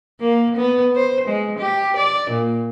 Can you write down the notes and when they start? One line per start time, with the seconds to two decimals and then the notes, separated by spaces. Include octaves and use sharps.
0.20 A#3
0.56 B3
0.95 C5
1.28 G#3
1.59 G4
1.97 D5
2.30 A#2